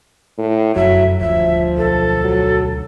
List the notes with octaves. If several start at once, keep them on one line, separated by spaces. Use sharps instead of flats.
A2
F1 F#2 F#3 E5
D#1 D2 F3 E5
B1 A4
F#3